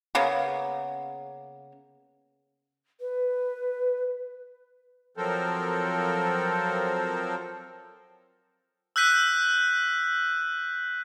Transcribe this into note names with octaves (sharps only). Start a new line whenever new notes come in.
C#3 A#3 B3
B4
F3 F#3 C4 A4 A#4 C5
E6 F#6 G6 B6 D#7